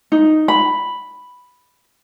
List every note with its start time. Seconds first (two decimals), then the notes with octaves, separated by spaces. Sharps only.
0.12 D#4
0.48 B5